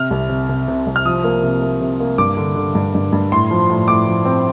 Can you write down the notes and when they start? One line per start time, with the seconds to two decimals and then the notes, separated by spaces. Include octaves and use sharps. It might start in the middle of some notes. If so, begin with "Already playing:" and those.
Already playing: C3 F6
0.11 C2
0.30 C3
0.49 C3
0.68 C3
0.87 C2
0.96 F6
1.05 F3 D#6
1.24 A#3
1.44 C3
1.62 A#3
1.81 C3
2.00 A#3
2.18 G2 D6
2.37 D3
2.56 D3
2.75 G2
2.95 G2
3.13 G2
3.32 A2 C6
3.51 F3
3.70 A2
3.88 A2 D6
4.07 F3
4.25 C4